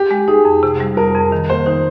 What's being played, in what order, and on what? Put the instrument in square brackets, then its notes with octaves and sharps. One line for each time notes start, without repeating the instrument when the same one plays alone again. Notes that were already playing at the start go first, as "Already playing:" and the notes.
Already playing: [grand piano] G4
[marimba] G#3
[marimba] D#4 [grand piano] G#4
[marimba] F2
C3
G3
[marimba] F2 [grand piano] A#4
[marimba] F2
D#3
[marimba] A#3 [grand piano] C5
[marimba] D#4 [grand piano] C5